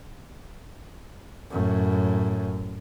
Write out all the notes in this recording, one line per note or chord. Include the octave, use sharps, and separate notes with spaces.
F#2 A2